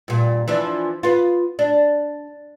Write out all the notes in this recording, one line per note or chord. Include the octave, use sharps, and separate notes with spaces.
G2 A#2
E3 F3 D4
B3 F4
D4